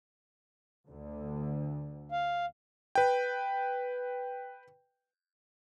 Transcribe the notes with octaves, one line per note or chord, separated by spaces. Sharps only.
D2 D3
F5
B4 G5